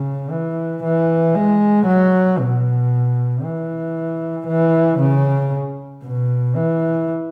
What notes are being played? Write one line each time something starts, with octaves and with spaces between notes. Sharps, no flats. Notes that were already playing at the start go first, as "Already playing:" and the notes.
Already playing: C#3
E3
E3
G#3
F#3
B2
E3
E3
C#3
B2
E3